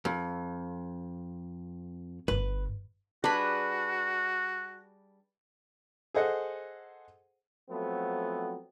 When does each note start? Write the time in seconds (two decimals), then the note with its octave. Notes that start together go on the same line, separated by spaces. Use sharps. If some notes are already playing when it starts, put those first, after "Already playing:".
0.05 F2
2.28 G1 B4
3.24 G3 D4 F#4 G#4 B4 B5
6.15 G#4 A4 C5 D#5 F#5
7.70 F3 F#3 A3 B3 C4